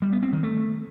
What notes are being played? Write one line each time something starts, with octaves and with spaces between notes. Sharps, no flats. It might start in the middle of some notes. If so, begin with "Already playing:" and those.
G3
B3
C4
D#3
A3